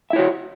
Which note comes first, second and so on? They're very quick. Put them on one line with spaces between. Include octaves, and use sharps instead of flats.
E5 E4 C#5 F#4